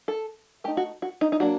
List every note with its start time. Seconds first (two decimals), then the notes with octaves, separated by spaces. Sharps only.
0.08 A4
0.64 A3 G4
0.68 D#4
0.77 F#4
1.02 F#4
1.21 D#4
1.32 D#4
1.40 F#3 A#3 D4 F#4